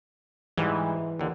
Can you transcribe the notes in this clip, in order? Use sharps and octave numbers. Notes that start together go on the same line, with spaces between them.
G#2 E3 G3 G#3
D#2 D3